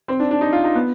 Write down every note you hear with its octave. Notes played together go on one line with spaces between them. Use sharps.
C4
D4
D4
D#4
F4
D#4
B3